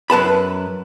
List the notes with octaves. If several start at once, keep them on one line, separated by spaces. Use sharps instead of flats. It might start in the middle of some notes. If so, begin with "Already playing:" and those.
F#2 B4 A5 B5